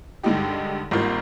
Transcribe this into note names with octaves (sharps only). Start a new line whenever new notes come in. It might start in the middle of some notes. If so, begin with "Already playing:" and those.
G2 D3 G#3 D#4 G4
G#1 G#2 G3 A#3 F4